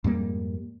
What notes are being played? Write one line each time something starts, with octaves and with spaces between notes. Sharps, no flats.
F2 G#2 G3 A#3